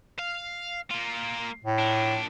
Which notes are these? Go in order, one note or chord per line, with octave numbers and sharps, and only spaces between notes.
F5
A#3 F4
A2
A#2 D4